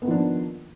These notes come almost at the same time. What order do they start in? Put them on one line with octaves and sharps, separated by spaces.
B3 D#3 F3 D4 A#3